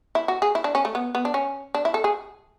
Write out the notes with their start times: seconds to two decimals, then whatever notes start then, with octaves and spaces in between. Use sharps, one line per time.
0.15 E4
0.28 F#4
0.42 G#4
0.55 E4
0.64 D4
0.75 C#4
0.85 A3
0.95 B3
1.15 B3
1.25 D4
1.34 C#4
1.75 D4
1.85 E4
1.94 A4
2.04 G#4